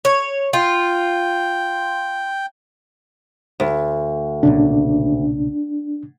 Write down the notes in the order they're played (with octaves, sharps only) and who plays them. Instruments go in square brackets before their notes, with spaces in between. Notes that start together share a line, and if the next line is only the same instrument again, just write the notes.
[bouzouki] C#5
[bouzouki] F4 [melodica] G5
[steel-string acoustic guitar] D2
[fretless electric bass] B1 A#2 C#3 [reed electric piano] D4